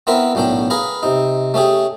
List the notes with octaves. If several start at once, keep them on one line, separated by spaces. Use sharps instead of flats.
B3 C4 E4 A#4 B4
B1 A2 C#4 D4 G5
G#4 B4 F5 A#5
C3 D#4
A3 C#4 G4 G#4